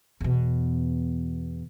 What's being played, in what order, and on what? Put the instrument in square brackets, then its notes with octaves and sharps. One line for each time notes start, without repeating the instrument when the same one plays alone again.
[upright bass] E2 B2